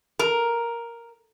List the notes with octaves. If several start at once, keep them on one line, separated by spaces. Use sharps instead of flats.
A#4